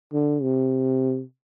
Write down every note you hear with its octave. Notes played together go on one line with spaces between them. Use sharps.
D3
C3